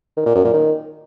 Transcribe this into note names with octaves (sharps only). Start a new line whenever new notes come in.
D#3
A#2
F#2
A#2
D#3